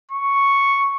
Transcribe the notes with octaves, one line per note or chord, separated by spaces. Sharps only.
C#6